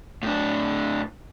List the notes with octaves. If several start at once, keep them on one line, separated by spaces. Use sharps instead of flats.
A2 D4